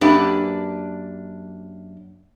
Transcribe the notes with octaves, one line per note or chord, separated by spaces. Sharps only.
F#2 A#3 D4 G4 B4